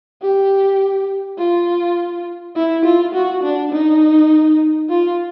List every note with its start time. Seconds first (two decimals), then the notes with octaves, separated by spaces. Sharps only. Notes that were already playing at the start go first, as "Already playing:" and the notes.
0.22 G4
1.38 F4
2.56 E4
2.85 F4
3.14 F#4
3.44 D4
3.73 D#4
4.90 F4